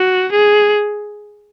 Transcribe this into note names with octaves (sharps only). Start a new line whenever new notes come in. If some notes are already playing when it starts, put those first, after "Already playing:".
Already playing: F#4
G#4